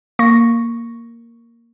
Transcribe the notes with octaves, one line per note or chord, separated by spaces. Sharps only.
A#3 C#6 A#6